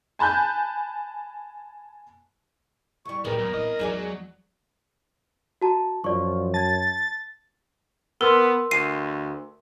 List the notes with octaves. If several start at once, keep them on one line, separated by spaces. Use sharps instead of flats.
G#5 A5 B5 F#6 G6
E2 G3 C#6
D2 A#2 G#3 B3 G4 A#4
F#2
C2 E4 D#5
E2 F#3 G#3 D#4 G#4 D5
F#4 A5 A#5
F#2 F3 D5 C#6
A5 G#6 A6
B3 A#4 C6 E6
D2 C7 D#7